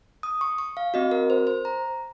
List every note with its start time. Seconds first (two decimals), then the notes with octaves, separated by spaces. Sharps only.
0.23 D#6
0.41 C#6
0.58 C#6
0.77 F5
0.94 C4 F#4 D#5
1.11 A#4
1.30 C5
1.47 C5
1.65 A#5